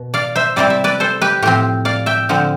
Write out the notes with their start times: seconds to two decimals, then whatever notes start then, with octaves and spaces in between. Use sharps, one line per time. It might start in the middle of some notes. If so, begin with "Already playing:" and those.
Already playing: B2
0.14 D5 F5
0.36 C5 E5
0.56 C3 G3 C4 E4 D5
0.70 E5
0.84 B4 D5
1.00 A4 C5
1.22 G4 B4
1.42 A2 F3 C4 G4
1.85 D5 F5
2.06 E5 G5
2.29 D3 F3 C4